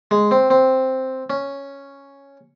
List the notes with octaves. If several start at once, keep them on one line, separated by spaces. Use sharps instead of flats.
G#3
C4
C4
C#4